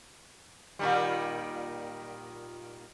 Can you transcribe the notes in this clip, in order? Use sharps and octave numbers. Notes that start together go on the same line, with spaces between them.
A#2 D#3 G3